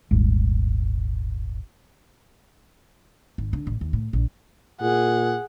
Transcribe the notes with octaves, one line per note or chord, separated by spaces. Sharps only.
D#1 G#1
G#1
D3
A1
D#2
A2
A#1
A#2 G#4 F#5